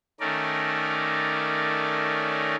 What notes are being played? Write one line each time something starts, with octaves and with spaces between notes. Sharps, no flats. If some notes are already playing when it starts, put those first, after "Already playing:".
D#3 A3 C#4 A#4 D5